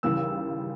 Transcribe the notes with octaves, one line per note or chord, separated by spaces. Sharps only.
D#2 C#3 E3 G3 E6